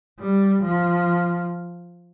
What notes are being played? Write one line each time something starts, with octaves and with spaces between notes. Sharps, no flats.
G3
F3